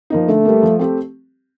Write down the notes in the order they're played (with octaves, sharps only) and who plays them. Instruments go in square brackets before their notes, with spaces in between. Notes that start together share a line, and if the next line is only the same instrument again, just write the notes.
[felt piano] F3 A#3 D#4
[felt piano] D3 [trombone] A3
[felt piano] G3 A#3
F3
A3 C4 G4